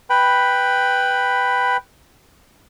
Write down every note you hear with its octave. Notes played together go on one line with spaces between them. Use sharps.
B4 G5 B5